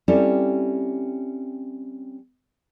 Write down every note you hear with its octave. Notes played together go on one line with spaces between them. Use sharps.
G3 C4 C#4 E4 G4 A4